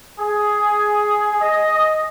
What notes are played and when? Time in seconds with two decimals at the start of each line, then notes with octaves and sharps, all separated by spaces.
0.18 G#4
1.40 D#5